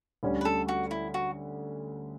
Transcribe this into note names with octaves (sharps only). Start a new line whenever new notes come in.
D2 D3 G3 C#4
B4
A4
F#4
E4
F#4